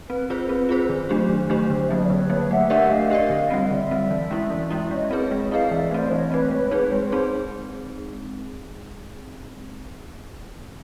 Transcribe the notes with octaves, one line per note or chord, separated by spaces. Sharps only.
C4 B4
F4 G#4 A#4 C5
C4 B4
F4 G#4 C5
D#3 C5
F#3 A3 D4 G4
D#3
F#3 A3 D4 G4
D3
E5
F#3 A#3 D#5
D5
D3 B4 C#5
F#3 A#3
A3 E5 F#5
D4 G4 A#4 D5 E5 F#5
A3 D#5 F5
D4 G4 A#4 D5
D3
G3 C4
D3 D5 E5
G3 C4
E3
G#3 C#4 E4
E3
G#3 C#4 E4
G#3 C#5 D#5
C4 E4 G#4 B4
G#3
C4 E4 G#4 B4 D#5 F5
E3 D5 E5
A3 C4 C5 D5
E3 C#5 D#5
A3 C4 B4 C#5
G#3 B4 C#5
C4 D#4 G#4 B4 C#5
G#3 C5
C4 D#4 G#4